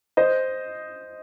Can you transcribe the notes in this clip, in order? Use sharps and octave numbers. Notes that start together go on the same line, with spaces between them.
C5 D#5